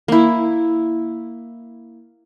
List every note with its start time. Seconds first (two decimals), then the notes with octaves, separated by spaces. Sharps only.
0.08 A#3 E4